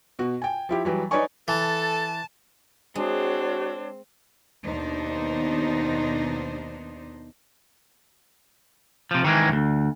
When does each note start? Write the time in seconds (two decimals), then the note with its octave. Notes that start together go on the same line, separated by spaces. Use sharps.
0.19 B2 F#4
0.42 G5 G#5
0.69 F3 E4 G4
0.85 E3 F#3 G3
1.11 D#4 B4 C#5 D5 G#5 C#6
1.48 E3 A4 A5
2.95 G#3 C4 D4 F#4 C#5
4.65 D#2 B2 B3 D4 D#4 C5
9.11 C3 F3
9.24 D#3 E3 G#3
9.49 D2 G2